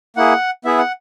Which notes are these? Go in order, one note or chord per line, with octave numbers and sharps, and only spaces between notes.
A#3 E4 G#4 F#5
B3 E4 G#4 E5
F#5